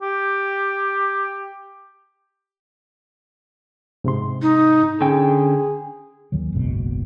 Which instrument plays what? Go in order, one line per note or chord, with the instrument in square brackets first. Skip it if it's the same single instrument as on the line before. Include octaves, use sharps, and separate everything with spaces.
[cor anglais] G4
[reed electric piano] G#2 C3 C6
[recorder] D#4
[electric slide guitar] D3 C#4 G5 [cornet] G#4
[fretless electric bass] D#2 D#3 F#3
F#1 B1 G#2 B2